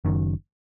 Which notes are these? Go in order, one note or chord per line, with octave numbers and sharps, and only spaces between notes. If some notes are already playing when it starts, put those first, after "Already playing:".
F#1 F#2 D#3